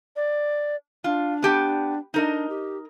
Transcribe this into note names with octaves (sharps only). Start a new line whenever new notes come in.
D5
D4 F4
B3 G4 A5
D4 D#4 A#4 D#5
G4